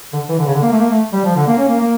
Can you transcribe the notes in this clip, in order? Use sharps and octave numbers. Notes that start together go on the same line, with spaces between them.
D3
E3
D3
C#3
D3
A#3
A3
A#3
A3
G3
F3
D3
A#3
C#4
A#3
A#3